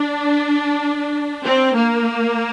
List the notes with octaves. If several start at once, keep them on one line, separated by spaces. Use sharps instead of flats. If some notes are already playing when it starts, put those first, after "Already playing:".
Already playing: D4
C4
A#3